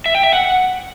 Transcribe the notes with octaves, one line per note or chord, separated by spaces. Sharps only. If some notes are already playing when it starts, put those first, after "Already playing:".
E5
G5
E5
F#5